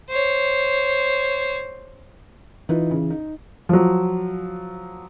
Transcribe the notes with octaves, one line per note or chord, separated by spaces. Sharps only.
C5 C#5
E3 D#4 F4 B4
C#3
D#4
F3 F#3